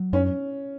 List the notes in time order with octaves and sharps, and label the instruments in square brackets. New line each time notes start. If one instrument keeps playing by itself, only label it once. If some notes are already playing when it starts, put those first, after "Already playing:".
Already playing: [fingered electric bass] F#3
[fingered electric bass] F#2 [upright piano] C#4